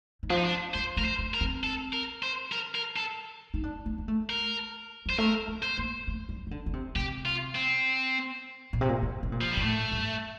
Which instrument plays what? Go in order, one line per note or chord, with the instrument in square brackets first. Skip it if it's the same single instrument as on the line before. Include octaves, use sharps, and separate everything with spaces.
[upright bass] D#3
[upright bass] F3 [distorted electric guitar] D4
[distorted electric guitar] D#4
D4
[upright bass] G3 [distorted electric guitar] C5
[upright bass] A3 [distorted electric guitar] A#4
[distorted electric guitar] C5
[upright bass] A3
[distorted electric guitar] A#4
[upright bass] C4
[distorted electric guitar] A4
A#4
C5
A#4
A#4
A4
[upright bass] D#4
D4
A3
A#3
A3
[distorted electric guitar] A#4
[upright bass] G3 [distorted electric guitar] C5
[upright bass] A3 [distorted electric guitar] A#4
[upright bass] A3
[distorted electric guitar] C5
[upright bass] A#3
A3
G3
D#3
D3
D3
C3
[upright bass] C3 [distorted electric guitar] G4
[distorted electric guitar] F4
C4
[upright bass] A#2
C3
A#2
C3
C3
A#2
[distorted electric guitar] F3
G3
[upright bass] A#2
[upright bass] A2 [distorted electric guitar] A3
[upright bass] G2